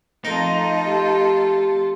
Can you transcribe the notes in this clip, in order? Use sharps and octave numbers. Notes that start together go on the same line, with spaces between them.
F2 A3 D#4 F4 A4 A#4
G4